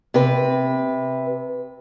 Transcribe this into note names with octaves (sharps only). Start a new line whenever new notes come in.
C3 B4